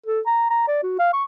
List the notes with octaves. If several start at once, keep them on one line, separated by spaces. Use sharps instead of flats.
A4
A#5
A#5
D5
F#4
F5
C#6